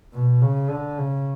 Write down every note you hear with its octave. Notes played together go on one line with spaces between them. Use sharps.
B2
C#3
D3
C#3